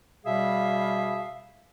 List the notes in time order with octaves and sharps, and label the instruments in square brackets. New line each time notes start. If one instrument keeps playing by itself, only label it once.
[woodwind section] B2 G3 G#4 E5 F5